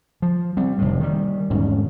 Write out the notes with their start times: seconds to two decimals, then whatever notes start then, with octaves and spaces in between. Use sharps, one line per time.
0.22 F3
0.57 G3 C4
0.78 F1 A2
1.00 D#3 G3
1.50 E1 G#2 D#3 C#4